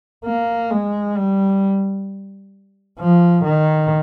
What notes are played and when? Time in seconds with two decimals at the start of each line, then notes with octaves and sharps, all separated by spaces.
0.25 A#3
0.71 G#3
1.17 G3
3.00 F3
3.44 D#3